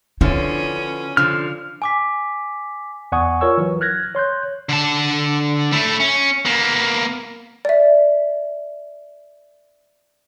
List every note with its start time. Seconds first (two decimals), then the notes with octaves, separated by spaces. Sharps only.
0.21 D3 F3 B3 C#4 E4
1.17 D3 F3 F6
1.82 G#5 D6 B6
3.12 E2 D5 F#5 G#5 C#6 D#6
3.41 F4 A#4 C#5 C#6 E6
3.58 E3 F#3
3.81 F6 F#6 G#6 A#6
4.15 C#5 C6 F#6 G6
4.69 D3 A5
5.73 A3 E4
6.00 C#4
6.45 A#3 B3
7.65 D5 E5